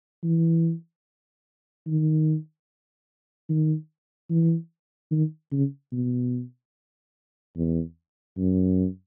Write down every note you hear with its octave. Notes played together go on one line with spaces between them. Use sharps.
E3
D#3
D#3
E3
D#3
C#3
B2
E2
F#2